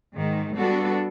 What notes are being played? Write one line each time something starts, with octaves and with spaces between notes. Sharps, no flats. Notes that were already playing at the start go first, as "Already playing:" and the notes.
G#2 D#3 G#3
G3 B3 D4 F#4 A4